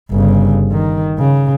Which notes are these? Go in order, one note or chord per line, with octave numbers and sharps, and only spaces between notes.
G1 C#3
D#3
C#3